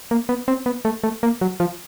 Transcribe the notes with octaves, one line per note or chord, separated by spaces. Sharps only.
A#3
B3
C4
B3
A3
A3
A#3
F#3
F3